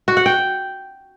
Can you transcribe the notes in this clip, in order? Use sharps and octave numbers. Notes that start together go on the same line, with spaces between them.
F#4
F#5
G5